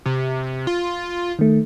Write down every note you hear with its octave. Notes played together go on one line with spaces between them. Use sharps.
C3
F4
D#3 A3